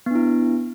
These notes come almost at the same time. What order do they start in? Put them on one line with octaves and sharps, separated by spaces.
B3 D4 E4